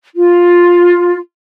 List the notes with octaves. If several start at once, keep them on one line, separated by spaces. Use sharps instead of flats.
F4